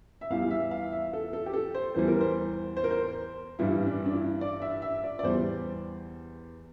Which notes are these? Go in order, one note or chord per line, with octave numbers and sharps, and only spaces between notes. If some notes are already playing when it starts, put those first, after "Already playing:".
E5
E2 E3 G3 F5
E5
F5
E5
A4
A4
G4
A4
C5
E2 E3 G3 C5
A#4
C5
C5
A#4
C5
G2 E3 G3 E4
D4
D4
E4
D5
E5
E5
D5
D5
E2 E3 G3 C5